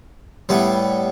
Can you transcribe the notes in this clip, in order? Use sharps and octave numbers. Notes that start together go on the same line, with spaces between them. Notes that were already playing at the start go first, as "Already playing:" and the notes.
A2 G3 B3 E4